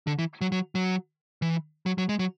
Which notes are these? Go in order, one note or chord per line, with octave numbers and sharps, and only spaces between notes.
D3
E3
F#3
F#3
F#3
E3
F#3
F#3
G#3
F#3